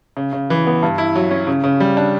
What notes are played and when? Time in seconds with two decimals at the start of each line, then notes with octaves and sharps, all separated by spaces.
0.17 C#3
0.33 C#3
0.50 E3
0.67 B3
0.83 G2
0.98 E4
1.16 F#3
1.31 C#4
1.47 C#3
1.64 C#3
1.80 G3
1.97 D4